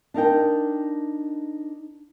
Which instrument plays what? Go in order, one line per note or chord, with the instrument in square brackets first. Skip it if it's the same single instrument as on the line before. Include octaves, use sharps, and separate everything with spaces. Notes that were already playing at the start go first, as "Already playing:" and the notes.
[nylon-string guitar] D4 D#4 A#4 G5